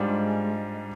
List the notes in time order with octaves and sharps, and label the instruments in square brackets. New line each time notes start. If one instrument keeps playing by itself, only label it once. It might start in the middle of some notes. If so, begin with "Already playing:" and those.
Already playing: [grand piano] G#2 G3 D4 F4 [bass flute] G#3